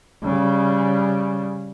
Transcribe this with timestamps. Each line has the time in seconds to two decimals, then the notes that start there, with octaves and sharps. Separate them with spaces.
0.23 C#3 G3